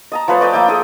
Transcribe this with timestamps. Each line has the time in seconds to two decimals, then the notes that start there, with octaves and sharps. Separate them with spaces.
0.12 D#5 A5 A#5
0.28 F3 A3 B4 C#5
0.41 D5 D#5 G5 A5
0.53 F3 A#3 E5 G5
0.68 G#4 A4 E5 D#6